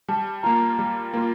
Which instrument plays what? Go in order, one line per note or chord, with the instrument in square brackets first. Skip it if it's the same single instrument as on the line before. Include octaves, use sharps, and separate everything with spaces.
[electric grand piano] G3 [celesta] A5
[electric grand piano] A#3 F4 [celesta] A#5
[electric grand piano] G3
A#3 F4